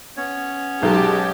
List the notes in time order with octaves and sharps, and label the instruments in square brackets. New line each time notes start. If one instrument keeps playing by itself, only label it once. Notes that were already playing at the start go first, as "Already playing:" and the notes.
[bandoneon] B3 C#4 C#5
[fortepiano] B1 [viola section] G#3 A5 [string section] G4